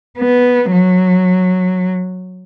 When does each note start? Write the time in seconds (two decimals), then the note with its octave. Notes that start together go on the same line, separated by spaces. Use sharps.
0.18 B3
0.72 F#3